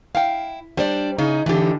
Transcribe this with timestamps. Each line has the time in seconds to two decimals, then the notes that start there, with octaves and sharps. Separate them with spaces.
0.15 E4 F5 G5
0.77 G3 D4 C5 D5
1.18 C#3 D#4 E4 G#4
1.46 A2 D3 E3 D#4 G4